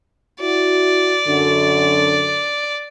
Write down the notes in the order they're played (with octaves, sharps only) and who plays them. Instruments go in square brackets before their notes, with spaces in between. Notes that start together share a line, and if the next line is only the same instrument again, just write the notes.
[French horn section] E4 F#4 [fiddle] D5
[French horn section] F#2 D3